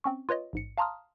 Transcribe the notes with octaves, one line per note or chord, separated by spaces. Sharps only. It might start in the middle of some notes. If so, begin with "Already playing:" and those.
C4 C#4 C#6
F4 B4 C#5 D#5
A1 G#2 C#7
F5 A5 A#5 C6 D#6 F6